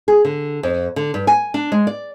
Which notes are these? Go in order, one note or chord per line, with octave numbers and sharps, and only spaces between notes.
G#4
D3
F2
D3
G2
G#5
D4
G#3
D5